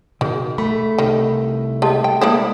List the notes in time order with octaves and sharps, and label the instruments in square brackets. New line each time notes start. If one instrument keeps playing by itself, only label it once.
[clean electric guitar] B2 [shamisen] D#3 [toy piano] G#4
[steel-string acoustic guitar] A3 [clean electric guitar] B5
[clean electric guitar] C2 [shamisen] D#3
[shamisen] G#3 G4 [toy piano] D#5 A5
[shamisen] G5
[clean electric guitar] G#3 A4 C5 [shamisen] A#3 D4 E4 [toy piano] D#6